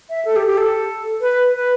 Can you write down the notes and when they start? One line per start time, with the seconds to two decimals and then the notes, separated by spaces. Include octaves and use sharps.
0.10 E5
0.25 A4
0.36 G4
0.47 G4
0.58 A4
1.21 B4
1.54 B4